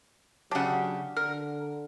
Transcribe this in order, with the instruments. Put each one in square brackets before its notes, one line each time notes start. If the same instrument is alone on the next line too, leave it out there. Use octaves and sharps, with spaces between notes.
[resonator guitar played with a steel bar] C#3 G4 [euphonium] F#3 [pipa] D4 F#5
[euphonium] D3 [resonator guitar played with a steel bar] A#4 [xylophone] F6